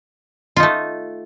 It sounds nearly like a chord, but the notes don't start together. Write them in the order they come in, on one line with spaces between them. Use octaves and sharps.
F4 D#4 A3